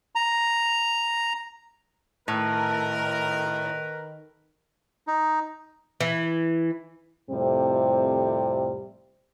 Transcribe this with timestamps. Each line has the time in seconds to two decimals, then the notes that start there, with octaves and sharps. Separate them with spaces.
0.15 A#5
2.28 A2 D#3 A#4 B4
5.07 D#4
6.01 E3
7.30 F2 A2 C3 G3 C4